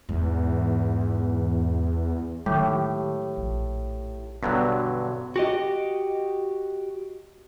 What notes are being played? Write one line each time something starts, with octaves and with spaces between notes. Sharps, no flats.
E2 G#2
A2 D#3 F#3 G#3 G4
A#1
G2 B2 D3 F#3
F#4 G4 D#5